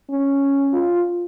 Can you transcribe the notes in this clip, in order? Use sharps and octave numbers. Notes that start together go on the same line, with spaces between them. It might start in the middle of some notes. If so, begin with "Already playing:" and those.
C#4
F4